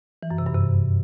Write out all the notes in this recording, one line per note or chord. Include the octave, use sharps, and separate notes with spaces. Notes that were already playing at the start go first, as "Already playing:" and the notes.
E3
F#2
C3
G2
C3